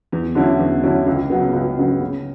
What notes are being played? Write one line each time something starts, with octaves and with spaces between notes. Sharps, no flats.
E2
D3 F#3 C#4 E4
E2
D3 F#3 C#4 E4
C#2
C#3 F#3 B3
C#2
C#3 F#3 B3
C#3